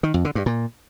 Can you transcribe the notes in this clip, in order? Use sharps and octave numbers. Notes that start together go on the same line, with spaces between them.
D#3
F2
D3
G2
A#2